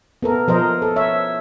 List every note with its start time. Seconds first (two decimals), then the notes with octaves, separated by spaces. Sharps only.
0.22 B3 A4 A#4
0.48 F3 A#4 C5 D#5
0.82 A4
0.96 C#5 E5